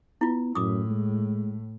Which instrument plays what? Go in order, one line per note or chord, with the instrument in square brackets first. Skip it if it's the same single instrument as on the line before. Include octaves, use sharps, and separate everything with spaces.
[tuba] B3 [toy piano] E4 F4
[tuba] F#2 [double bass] A2 [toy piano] D6 D#6
[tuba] G#3